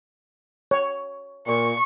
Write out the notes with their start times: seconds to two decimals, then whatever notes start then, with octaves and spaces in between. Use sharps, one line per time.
0.71 C#5
1.47 A#2 C#6